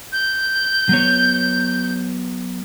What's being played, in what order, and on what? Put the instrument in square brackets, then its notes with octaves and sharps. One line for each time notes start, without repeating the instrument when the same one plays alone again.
[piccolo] G6
[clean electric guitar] F#3 B3 C#5